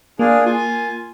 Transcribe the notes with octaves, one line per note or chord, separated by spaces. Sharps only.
A#3 D4 F4 G#4
F4 G#5